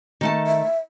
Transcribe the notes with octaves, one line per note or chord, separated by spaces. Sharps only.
D#3 A3 A5
E5